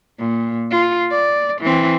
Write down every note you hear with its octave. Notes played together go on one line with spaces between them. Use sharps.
A#2
F4
D5
E3 C4